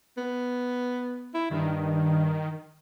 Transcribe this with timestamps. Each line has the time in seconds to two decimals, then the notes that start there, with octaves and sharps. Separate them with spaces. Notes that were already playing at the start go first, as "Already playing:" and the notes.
0.17 B3
1.34 E4
1.51 G2 D#3